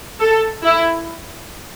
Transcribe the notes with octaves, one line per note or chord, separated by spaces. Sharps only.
A4
E4